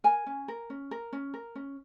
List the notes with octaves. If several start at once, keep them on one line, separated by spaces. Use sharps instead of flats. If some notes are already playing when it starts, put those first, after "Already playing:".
A#4 G#5
C#4
A#4
C#4
A#4
C#4
A#4
C#4